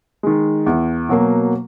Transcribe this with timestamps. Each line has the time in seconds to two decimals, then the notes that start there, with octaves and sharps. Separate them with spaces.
0.23 D#3 G#3
0.66 E2
1.09 B2 F#3 A#3